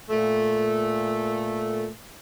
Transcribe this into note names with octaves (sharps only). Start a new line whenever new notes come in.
A#2 A3